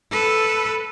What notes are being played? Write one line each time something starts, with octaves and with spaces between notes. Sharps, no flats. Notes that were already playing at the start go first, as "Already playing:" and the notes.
A4 B4